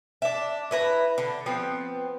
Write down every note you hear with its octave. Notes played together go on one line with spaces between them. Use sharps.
D4 E5
E4 B4 A#5
D3
F3 B3 C4